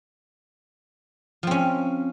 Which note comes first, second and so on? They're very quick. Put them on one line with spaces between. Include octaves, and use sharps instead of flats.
F3 C4 C#4